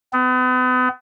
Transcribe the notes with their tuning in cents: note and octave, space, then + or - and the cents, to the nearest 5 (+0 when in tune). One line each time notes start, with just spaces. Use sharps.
B3 +40